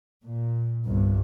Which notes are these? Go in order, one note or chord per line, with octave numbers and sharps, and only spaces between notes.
A#2
G1 C2 G2